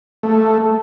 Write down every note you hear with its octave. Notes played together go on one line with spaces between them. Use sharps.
A3